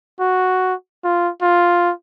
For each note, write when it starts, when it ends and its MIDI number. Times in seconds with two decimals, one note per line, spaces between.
0.20 0.74 66
1.04 1.30 65
1.42 1.92 65